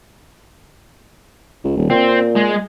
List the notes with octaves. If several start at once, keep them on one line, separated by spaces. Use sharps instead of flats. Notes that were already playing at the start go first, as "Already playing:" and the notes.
C#2
D#1
A#2 C4
G#3